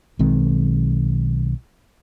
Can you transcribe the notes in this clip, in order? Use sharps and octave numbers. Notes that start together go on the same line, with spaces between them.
B1 D#3 G#3 C4